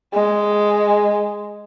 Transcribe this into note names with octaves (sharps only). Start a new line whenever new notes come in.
G#3